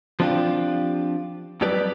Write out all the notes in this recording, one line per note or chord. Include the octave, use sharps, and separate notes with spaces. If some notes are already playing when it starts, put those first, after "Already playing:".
F3 C4 D4 F4 G4
F2 F#3 G3 G4 B4 D5